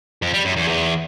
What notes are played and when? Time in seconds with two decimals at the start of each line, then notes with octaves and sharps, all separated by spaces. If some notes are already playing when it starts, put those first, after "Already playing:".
0.22 F2
0.33 G3
0.45 F#2
0.56 E2
0.68 E2